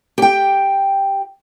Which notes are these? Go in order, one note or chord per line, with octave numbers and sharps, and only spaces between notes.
G4 G5